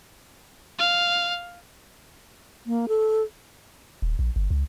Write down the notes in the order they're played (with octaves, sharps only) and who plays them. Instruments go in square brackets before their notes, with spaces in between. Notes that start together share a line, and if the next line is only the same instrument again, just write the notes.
[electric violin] F5
[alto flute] A#3
A4
[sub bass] D#1
A#1
G1
C#2